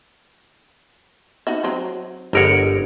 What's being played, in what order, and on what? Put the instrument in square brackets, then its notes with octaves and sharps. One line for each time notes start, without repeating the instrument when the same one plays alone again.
[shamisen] D#4 F#4 E5
F#3 C4 D#4
[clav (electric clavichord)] G1 A#4 C#5 [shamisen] G#3 B4 F#5